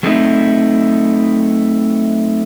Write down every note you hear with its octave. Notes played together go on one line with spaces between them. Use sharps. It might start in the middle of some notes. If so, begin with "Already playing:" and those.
F#3 A3 C4 D#4 E4